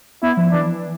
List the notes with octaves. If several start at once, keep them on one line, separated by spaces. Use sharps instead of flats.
B3 E4
F3
E3 D4